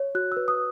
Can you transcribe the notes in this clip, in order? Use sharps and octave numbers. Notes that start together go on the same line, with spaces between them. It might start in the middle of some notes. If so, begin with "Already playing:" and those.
Already playing: C#5
F#4 F#6
B4 E6
D#6